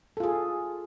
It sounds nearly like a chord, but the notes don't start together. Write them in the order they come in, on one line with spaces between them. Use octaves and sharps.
A4 F4 G#4